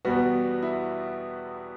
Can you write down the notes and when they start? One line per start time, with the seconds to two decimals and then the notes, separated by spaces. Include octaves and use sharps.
0.05 E2 B2 G3 B3 F#4
0.62 E4